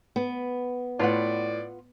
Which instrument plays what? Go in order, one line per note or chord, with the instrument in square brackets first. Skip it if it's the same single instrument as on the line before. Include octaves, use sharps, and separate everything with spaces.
[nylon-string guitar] B3
[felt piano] A2 [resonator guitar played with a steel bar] F4 B4 F#5 [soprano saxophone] D5